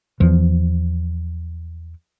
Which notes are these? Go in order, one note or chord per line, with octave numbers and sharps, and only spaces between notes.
E2 E3 F3